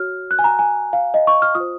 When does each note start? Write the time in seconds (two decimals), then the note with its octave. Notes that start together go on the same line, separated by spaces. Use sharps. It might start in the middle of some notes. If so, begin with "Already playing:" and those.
Already playing: F#4 C#5 F6
0.31 F#6
0.39 G#5
0.44 A#5
0.59 G#5
0.93 F5
1.14 D#5
1.27 C#6
1.42 F6
1.55 F4 D#6
1.60 C5